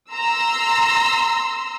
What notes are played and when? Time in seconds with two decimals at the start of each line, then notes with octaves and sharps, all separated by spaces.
0.11 A#5 C6 E6